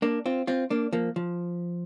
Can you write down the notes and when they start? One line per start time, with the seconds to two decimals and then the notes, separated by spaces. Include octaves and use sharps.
0.02 A#3 D4
0.26 C4 F4
0.47 C4 F4
0.70 A#3 D4
0.93 F3 A#3
1.16 F3